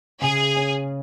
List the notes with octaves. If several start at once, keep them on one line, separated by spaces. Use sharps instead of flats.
C#3 G#4
C#4